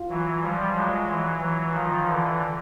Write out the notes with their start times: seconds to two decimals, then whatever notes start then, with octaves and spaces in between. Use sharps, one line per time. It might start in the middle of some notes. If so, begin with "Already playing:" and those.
Already playing: F4
0.09 E3 F#3
0.42 F3 G3
0.75 F#3 G#3
1.08 E3 F#3
1.41 E3 F#3
1.74 D#3 F3 F4
2.07 D3 E3